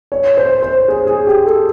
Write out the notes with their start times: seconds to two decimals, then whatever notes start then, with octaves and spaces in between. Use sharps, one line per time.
0.12 C#5
0.37 C5
0.63 C5
0.88 G#4
1.07 G#4
1.27 G4
1.46 A4